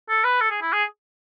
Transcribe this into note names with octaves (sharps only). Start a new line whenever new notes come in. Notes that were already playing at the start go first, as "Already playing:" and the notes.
A4
B4
A4
G#4
E4
G#4